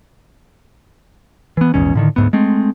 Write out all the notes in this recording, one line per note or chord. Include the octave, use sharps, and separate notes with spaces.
E3 B3
A#1 E2 G#2 C#4
A2 D3 D#3
D2 G#2 B3
G#3 A3 C4